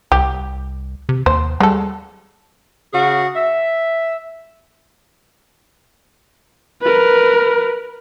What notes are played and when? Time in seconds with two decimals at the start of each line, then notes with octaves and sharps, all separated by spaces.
0.12 C2 G4
1.09 C3
1.26 D#2 C5
1.60 G3 G#3 A4
2.93 C#3 F#4 G#4
3.36 E5
6.82 A#4 B4